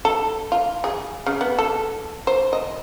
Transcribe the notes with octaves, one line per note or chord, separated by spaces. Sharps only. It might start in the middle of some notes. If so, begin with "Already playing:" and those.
A4
F4
G#4
C#3
B3
A4
C5
D#5